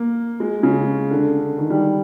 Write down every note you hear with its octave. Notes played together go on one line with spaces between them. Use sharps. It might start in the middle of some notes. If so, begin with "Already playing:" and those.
Already playing: A#3
G#3
C#3
D3
D#3
G3